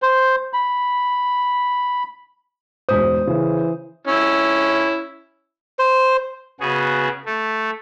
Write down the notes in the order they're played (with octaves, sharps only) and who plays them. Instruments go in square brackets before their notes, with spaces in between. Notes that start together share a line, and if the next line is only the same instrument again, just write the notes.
[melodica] C5
B5
[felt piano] E1 G#2 D#6 [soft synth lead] C5
[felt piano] C#3 [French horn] E3
[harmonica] C#4 E4
[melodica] C5
[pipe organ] C#3 B3 F#4 G#4
A3